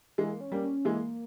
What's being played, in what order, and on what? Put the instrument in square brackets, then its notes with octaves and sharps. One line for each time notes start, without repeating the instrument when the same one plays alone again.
[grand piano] E3 G#3 [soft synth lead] A#3
[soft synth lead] C#4
[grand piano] G3 A#3
[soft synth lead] C#4
[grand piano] E3 G#3 [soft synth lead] A#3